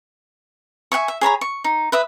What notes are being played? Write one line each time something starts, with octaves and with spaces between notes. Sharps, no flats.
E5 F#5 G#5 C#6
E5
G#4 C#5 A#5 B5
C#6
D#4
B4 E5 D#6